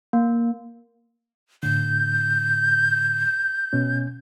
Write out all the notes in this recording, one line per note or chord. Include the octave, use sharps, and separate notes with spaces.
A#3
A2 D3 G6
B2 C#4